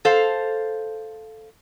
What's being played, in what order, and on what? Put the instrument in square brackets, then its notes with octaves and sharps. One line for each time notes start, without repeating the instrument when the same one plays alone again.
[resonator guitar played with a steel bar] A4 C5 F5